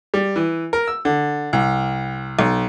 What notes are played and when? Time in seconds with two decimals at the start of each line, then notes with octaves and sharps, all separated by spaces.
0.14 G3
0.36 E3
0.73 A#4
0.88 E6
1.05 D3
1.53 C2
2.39 B1